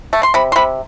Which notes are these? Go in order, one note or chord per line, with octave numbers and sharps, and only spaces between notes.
A3
C6
C3 B5
C6
C3 B5